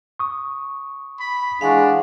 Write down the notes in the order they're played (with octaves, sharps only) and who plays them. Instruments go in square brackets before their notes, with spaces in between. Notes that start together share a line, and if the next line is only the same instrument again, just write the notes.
[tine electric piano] C#6 D#6
[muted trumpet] B5
[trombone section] E3 G#3 [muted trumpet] D4 [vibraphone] F5 F#5 C#6